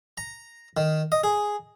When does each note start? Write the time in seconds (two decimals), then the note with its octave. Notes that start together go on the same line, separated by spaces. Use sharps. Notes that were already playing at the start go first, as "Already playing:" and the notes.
0.18 A#5
0.77 D#3
1.12 D#5
1.24 G#4